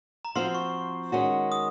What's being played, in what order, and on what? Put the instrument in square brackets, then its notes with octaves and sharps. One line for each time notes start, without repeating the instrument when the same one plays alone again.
[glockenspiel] A#5
[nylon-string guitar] F3 C4 F#4 C5 F5 [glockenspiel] C6
[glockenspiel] C#6
[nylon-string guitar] D#3 G#3 C#4 F#4
[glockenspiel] D#6